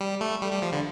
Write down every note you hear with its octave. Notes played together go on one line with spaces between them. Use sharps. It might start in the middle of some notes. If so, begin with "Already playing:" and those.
G3
A3
G3
G3
F3
D3